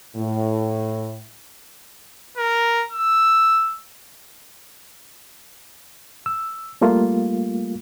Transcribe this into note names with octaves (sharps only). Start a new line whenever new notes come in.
A2
A#4
E6
E6
G3 A3 A#3 F4